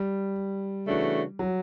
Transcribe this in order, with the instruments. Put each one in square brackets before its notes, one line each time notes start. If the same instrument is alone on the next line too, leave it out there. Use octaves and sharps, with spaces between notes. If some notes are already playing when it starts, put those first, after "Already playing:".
Already playing: [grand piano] G3
[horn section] C#3 E3 A3 D4 F#4
[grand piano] F#3